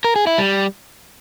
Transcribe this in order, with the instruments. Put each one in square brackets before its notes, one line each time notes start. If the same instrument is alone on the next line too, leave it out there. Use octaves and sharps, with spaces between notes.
[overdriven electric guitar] A#4
G#4
E4
G3